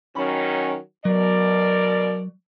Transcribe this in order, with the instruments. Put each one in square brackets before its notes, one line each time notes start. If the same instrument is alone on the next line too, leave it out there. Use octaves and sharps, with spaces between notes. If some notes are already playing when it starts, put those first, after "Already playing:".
[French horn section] D#3 F#3 C#4 [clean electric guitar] B5
[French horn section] B2 A#4 D5 [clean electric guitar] F#3